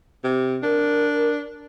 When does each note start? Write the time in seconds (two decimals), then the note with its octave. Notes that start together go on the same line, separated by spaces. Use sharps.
0.24 C3
0.63 D4 A#4